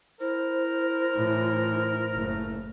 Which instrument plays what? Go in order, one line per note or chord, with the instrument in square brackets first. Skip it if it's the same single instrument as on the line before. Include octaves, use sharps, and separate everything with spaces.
[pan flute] E4 [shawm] A#4 [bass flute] C5
[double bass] A2 E3
F#1 A3